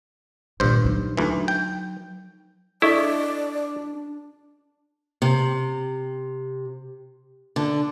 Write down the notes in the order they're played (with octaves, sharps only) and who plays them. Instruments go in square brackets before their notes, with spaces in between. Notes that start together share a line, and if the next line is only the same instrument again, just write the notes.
[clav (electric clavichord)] G2 C5 [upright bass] A#2 D#3
[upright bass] F#3 D#4
[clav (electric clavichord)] D2 E3
G5
[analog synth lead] D4 [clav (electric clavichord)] E4 [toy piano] A4 D#5 C#6 [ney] D5
[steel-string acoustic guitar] C3
D3